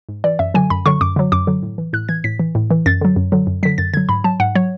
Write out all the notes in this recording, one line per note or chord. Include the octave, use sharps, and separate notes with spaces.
G#2
E3 D5
F#2 E5
D3 F#3 G#5
F#2 B5
D3 F#3 C#6
F#2 D6
D3 F#3
F#2 D6
D3 F#3
A2
E3
A2 F#6
E3 G#6
A2 B6
E3
A2
E3
F#2 A6
D3 F#3
F#2
D3 F#3
F#2
D3 F#3 B6
F#2 A6
D3 F#3 G#6
G#2 B5
F#3 A5
G#2 F#5
F#3 C#5